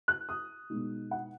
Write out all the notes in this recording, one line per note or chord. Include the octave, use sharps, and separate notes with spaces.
F#6
D#6
B2 G#3 B3 D#4
F#5